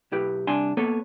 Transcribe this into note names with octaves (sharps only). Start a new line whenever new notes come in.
B1 E4 G4 B4
C2 D4 G#5 C6
A#3 B3 A4 B4 C#5